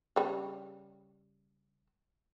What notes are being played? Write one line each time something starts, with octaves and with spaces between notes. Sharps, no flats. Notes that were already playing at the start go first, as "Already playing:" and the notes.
C#3 G3